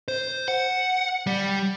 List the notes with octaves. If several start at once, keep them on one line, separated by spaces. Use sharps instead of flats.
C5
F#5
G3